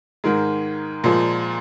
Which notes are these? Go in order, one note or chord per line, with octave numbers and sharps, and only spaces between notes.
G#2 D#3 G#3 A#4
A#2 F3 G#3